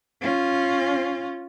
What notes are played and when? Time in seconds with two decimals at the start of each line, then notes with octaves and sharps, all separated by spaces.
0.22 C#4 F4